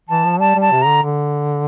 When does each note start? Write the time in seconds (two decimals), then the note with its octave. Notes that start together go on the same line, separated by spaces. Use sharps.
0.09 E3 A5
0.25 F3
0.40 G3 A5
0.55 G3
0.61 A5
0.71 C3
0.82 D3 A#5
1.02 D3